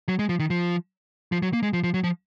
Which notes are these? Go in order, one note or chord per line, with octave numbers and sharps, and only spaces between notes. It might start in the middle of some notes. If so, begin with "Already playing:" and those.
F#3
G#3
F3
D#3
F3
F3
F#3
A#3
G#3
F3
F3
F#3
F3